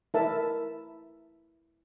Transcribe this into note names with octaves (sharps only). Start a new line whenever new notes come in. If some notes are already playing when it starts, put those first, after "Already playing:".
E4 A#4 E5 A5